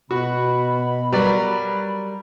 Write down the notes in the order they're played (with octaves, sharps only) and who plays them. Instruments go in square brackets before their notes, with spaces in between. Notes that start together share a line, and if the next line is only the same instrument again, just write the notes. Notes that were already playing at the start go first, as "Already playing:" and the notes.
[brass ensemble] B2 [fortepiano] F#4 [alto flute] B5
[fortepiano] F#3 B4 D5 [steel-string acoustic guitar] G3 A#4